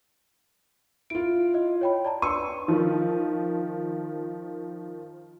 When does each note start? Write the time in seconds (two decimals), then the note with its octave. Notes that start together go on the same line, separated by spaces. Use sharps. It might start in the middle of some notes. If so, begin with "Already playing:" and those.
1.10 E4 F4 D7
1.54 D#5
1.81 C#5 G5 B5
2.05 D5 A5 A#5
2.22 D4 B4 C6 C#6 E6 D#7
2.68 D#3 F3